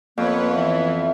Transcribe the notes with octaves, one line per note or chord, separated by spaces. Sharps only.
F2 A#3 B3 B4 C#5
E3 B3 E5